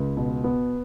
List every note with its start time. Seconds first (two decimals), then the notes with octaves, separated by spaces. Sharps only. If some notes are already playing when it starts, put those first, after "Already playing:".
Already playing: C#2
0.17 B2
0.44 B3